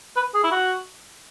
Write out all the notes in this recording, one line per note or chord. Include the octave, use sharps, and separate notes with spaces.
B4
G#4
E4
F#4